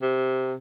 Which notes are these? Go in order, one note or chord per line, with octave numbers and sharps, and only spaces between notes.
C3